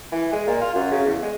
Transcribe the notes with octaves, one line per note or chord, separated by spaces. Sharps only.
E3
G#3
A#2
F4
F#2
C#3
E2
G#3